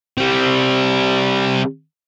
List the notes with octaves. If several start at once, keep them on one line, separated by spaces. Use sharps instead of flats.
G3 C4